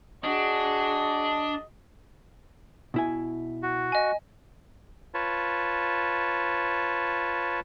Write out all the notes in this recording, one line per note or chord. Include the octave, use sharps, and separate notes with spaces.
D4 F#4 G#4 D#5
B2 E4 G#5
F#4
D#5 G#5
F4 B4 C#5 A5